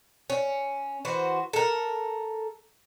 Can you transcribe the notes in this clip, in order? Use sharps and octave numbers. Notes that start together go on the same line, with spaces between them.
C#4
E3 F#4 C5
A4 A#4